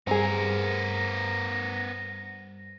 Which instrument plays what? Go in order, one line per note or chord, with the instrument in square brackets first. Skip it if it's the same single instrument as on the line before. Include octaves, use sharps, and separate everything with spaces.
[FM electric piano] G2 G3 [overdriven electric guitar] B3 A#4 [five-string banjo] C4 G#4 [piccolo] A#6